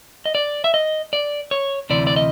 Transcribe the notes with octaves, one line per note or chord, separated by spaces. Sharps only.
D#5
D5
E5
D#5
D5
C#5
D2 C3 E3 D5
D5
D#5